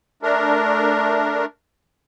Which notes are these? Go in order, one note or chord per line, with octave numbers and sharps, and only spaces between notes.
A3 D4 A#4